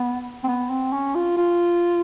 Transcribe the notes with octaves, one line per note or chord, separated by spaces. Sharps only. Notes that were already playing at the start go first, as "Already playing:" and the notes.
Already playing: B3
C4
B3
C4
C#4
F4
F4